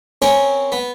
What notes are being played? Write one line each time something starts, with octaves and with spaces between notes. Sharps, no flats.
C4 C#4 A#4 C#5
B3